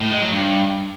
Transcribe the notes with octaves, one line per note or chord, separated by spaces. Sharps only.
A2
G#3
F#3
G2